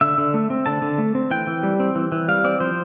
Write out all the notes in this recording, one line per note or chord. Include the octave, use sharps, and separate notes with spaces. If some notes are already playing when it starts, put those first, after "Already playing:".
D3 E5
D3
A3
C4
D3 A5
D3
A3
C4
E3 G5
E3
G3
C4
E3
E3
G3 F5
C4 D5
F3 C5